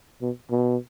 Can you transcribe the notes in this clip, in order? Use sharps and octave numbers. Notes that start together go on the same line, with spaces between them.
B2
B2